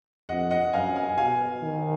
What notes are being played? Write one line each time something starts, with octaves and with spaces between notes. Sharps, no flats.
F2 D#5 F#5
D#5 F#5
F#2 F5 G#5
F5 G#5
B2 F5 G#5
D#3